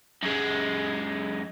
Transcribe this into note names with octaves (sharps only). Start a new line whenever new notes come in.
F#2 G#3